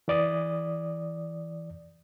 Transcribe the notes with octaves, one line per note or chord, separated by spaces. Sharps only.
E3 D5 D#6